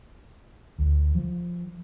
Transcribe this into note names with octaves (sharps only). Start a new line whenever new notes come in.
D2
F3